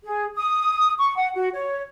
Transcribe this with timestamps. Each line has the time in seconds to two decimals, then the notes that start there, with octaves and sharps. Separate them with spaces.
0.03 G#4
0.36 D#6
0.98 C#6
1.16 F#5
1.34 F#4
1.53 C#5